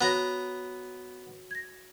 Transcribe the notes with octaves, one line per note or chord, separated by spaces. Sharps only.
B3 F#4 C#5 A#5 A#6
G#6 A#6